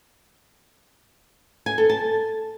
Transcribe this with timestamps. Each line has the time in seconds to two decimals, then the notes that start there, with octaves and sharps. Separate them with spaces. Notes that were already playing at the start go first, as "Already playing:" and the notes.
1.66 G#5
1.78 A4
1.89 A5